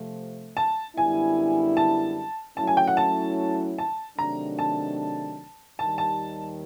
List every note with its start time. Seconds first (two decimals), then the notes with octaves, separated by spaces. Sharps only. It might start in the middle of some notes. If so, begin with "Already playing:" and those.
Already playing: C3 F3 A3
0.57 A5
0.96 F#2 D3 G3 B3 E4 G#5
1.77 A5
2.57 F#3 A3 C#4 E4 A5
2.67 G#5
2.77 G5
2.88 F#5
2.97 A5
3.78 A5
4.18 C3 D#3 F#3 A3 D4 A#5
4.59 A5
5.78 D#2 D#3 G3 A5
5.98 A5